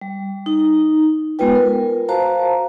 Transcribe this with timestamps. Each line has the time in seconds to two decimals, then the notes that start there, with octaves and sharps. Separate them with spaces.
0.01 G3
0.46 D#4
1.39 G#3 B3 F4 B4 G5
1.55 A#4
2.09 F#4 C5 F5 A5 A#5